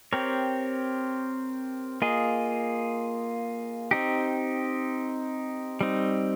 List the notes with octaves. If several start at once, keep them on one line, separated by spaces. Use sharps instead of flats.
C4 G4 A#4 C#5
A#3 F4 G#4 D#5
C4 D#4 G4
G3 C4 D#4